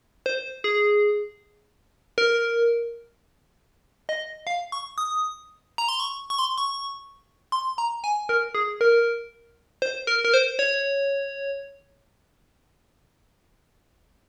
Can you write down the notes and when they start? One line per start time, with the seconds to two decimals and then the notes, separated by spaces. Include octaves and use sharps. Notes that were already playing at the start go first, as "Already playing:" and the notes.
0.26 C5
0.64 G#4
2.18 A#4
4.09 D#5
4.47 F5
4.72 C#6
4.98 D#6
5.78 A#5
5.89 C6
6.00 C#6
6.30 C#6
6.39 C6
6.58 C#6
7.52 C6
7.78 A#5
8.04 G#5
8.29 A#4
8.55 G#4
8.81 A#4
9.82 C5
10.07 A#4
10.25 A#4
10.34 C5
10.59 C#5